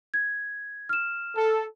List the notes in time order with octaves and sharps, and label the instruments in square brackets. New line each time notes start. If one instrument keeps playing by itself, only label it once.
[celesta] G#6
F6 E7
[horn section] A4